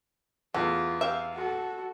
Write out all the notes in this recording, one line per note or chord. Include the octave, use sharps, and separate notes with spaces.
E2 A3 F4
G4 E5 F5
F#4 A4